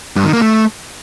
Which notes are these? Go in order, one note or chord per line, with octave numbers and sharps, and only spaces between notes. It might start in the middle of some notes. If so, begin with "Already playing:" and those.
G2
D#3
A#3
A3